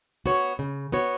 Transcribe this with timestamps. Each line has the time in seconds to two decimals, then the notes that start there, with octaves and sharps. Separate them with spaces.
0.26 B3 F#4 C#5
0.59 C#3
0.92 B3 F#4 C#5